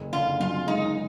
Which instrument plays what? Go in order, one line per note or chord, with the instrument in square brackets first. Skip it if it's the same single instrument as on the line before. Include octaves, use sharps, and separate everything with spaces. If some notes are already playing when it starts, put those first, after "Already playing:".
Already playing: [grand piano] F#1
[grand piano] D3 [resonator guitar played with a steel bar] F4
[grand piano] F#2 [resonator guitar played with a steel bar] F4
[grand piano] G#3 [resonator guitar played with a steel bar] D#4